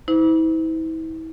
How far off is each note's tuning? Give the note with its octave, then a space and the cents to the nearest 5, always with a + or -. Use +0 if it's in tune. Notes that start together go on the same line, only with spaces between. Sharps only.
E4 -40 C5 -40